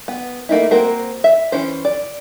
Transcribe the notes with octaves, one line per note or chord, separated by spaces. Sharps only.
B3
A3 A#3 D#4 E4
A#3 C4 F#4 A#4 C5
E5
E3 C#4 C5
D5